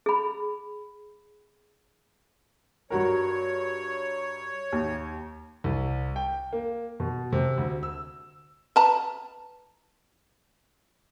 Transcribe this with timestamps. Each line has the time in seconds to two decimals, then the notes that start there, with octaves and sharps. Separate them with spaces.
0.06 G#4 B5
2.90 G2 F#4 A#4 C#5
4.73 D#2
5.64 C2
6.16 G5
6.53 A#3
7.00 B2
7.32 C3
7.58 D2
7.83 E6
8.76 B4 A5 A#5